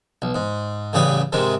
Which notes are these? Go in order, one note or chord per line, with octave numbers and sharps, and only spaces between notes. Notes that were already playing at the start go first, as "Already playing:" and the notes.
B1
G#2
A1 C#3 G3 G#4 B4
G#2 C3 D#3 G#3